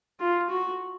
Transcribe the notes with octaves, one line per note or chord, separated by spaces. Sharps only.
F4
F#4